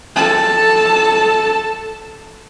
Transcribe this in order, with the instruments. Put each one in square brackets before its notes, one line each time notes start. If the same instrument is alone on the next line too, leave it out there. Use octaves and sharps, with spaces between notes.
[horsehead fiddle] A4 A5